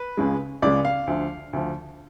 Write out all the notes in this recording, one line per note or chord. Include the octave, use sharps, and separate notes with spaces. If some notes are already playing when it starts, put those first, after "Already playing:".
Already playing: B4
C#2 C#3 G#3
C#2 C#3 G#3 D5
F5
D2 D3 F3
D2 D3 F3